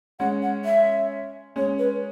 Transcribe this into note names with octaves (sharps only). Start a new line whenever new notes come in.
G#3 C#4 F#5
F#5
E5
G#3 C#4 C#5
B4